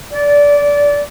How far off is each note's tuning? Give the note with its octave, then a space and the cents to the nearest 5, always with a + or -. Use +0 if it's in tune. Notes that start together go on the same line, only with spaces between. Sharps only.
D5 -20